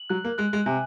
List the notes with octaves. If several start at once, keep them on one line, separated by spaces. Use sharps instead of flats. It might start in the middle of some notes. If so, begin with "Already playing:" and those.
Already playing: F#7
F#3 F#6
A#3
G#3 F#6
G#3
C3 G#5